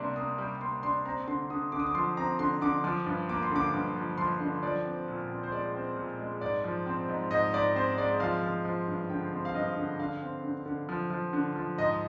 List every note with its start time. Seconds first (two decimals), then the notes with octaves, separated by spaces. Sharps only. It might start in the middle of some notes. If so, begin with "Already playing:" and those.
Already playing: C3 G3 A#3 D4 C6
0.16 A#3 D#6
0.38 G3 D6
0.61 A#3 C6
0.83 D4 C6
1.05 C4 A#5
1.28 D3 C6
1.50 D3 D#6
1.72 D3 D6
1.80 D#6
1.87 D6
1.95 F3 C6
2.17 C4 A#5
2.39 D3 C6
2.61 D3 D6
2.84 F3 D6
3.06 G2
3.29 A#3 D6
3.42 C6
3.51 D3 D6
3.73 G2 D6
3.96 F3
4.18 F3 C6
4.40 D3
4.63 F3 D5
4.85 C4
5.08 A#2
5.30 C4
5.43 C5
5.52 G#3 D5
5.75 C4
5.96 A#2
6.19 G#3
6.41 G#2 D5
6.64 F3
6.86 C4
7.08 G#2
7.31 G#2 D#5
7.54 G#2 D5
7.75 C4 C5
7.98 G#3 D5
8.20 F3 F5
8.43 F3
8.65 F3
8.88 G2
9.09 D3 G5
9.32 C4
9.45 F5
9.54 G2 D#5
9.77 D3
9.99 D3 F5
10.22 C4
10.44 D3
10.66 D3
10.89 F3
11.10 F3
11.33 D3
11.56 F3
11.78 G#2 D#5